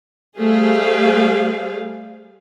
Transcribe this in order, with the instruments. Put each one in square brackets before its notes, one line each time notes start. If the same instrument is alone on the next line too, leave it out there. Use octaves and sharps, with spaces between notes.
[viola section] G3 A3 G#4 C5 F5